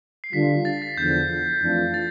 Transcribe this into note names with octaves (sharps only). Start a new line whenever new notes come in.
C7
D3 G3 D4 F4 B6
A6
A6
E2 D3 F3 G6
F2 E3 A3 D4 F4
A6